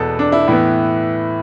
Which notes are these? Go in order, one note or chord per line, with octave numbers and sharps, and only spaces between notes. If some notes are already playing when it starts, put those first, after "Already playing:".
Already playing: E2 B2 B3 A4
D4
E4
A2 E3 B3